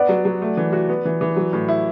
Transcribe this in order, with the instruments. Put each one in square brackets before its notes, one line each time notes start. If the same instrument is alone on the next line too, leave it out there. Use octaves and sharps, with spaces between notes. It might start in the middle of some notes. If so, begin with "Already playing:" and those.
Already playing: [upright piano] B3 [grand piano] D5 F#5
[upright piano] F#3
F#3
A3
E3
F#4
B3
E3
E3
F#3
A2
E4